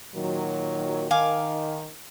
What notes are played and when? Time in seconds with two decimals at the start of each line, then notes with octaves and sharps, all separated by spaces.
0.15 A#2 D#3 F#3
1.11 D#3 F5 G#5 D6